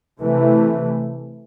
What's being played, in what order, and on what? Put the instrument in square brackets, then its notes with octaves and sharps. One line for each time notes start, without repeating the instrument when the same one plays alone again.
[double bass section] C3 E3 A3